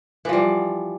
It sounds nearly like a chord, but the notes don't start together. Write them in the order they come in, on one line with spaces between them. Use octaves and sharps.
E3 F3 G3